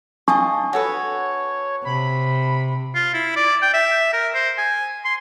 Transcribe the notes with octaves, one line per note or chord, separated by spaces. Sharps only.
D4 F4 D#5 G#5 A5 C#6
F#4 A4 B4 C#5
C3 B5
F4
E4
D5
G5
E5
A#4
C5
G#5
C6